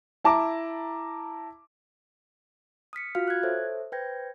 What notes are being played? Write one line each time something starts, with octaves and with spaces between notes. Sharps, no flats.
E4 A5 A#5 D6
D#6 F6 B6 C#7
F4 F#4 F5 F6
F#6 G#6
A4 C5 C#5 E5
B4 C5 G5 G6 G#6 A#6